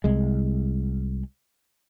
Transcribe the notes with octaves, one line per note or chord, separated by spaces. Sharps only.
C2 G#3